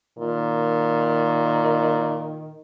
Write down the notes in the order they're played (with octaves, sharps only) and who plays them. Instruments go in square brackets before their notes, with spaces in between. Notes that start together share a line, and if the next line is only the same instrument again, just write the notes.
[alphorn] A#2 [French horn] D#3